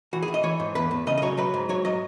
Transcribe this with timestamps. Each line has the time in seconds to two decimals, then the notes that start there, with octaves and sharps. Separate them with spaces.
0.13 E3 F#4
0.22 G#4
0.28 E3
0.34 D#5
0.43 E3 C#5
0.60 G#2
0.75 E2 B4
0.91 E2
1.07 C#3 D#5
1.18 D#5
1.22 F#3 C#5
1.37 F#3 B4
1.54 G#2
1.69 F#3 C#5
1.85 F#3 D#5